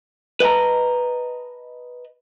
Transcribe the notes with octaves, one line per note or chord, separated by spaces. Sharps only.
B4 D#5 F#5 A5 A#5